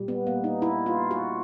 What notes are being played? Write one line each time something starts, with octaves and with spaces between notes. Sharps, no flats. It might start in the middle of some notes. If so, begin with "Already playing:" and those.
Already playing: A#2 G3
B3
A#3
D#4
E4
F4
F#4